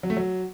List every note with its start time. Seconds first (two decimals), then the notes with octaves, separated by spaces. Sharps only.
0.03 F#3
0.10 A3
0.17 F#3